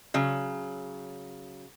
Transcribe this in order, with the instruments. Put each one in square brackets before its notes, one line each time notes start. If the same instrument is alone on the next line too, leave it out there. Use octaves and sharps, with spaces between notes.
[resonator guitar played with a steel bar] C#3 F#3